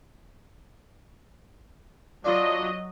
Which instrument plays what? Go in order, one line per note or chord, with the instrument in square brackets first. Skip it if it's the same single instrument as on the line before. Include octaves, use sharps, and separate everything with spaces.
[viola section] F#3 D#5 [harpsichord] D4 F4